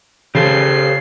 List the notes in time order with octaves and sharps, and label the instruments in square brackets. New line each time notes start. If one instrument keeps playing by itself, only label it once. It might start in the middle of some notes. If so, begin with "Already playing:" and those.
[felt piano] C#3 [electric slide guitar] G4 A4 C5 [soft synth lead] C7